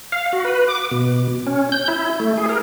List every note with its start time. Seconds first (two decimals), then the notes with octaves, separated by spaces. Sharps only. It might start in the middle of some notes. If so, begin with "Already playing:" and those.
0.12 F5
0.33 F#4
0.45 B4
0.68 D6
0.92 B2
1.47 C#4
1.72 G6
1.88 E4
2.20 A3
2.37 G#4
2.49 A#4